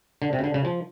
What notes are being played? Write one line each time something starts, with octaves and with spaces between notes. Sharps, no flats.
D3
C3
C#3
D3
C#3
F3